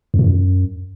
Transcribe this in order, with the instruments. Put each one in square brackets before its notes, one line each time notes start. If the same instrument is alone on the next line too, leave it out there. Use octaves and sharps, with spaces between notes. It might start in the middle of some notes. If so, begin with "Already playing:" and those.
[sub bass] F2
A#2
F#2